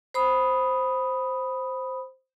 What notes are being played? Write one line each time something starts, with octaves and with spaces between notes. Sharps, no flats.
C5 B5 D#6